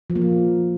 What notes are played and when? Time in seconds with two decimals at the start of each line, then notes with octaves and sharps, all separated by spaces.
0.10 F3
0.15 A#3
0.21 F3